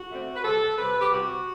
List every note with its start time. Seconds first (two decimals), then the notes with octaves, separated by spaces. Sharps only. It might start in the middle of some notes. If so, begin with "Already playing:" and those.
Already playing: F#4
0.11 D3 A3 C4
0.36 B4
0.43 C3 G3 C4 A4
0.78 C3 G3 C4 B4
1.01 G4
1.11 C3 G3 C4 F#4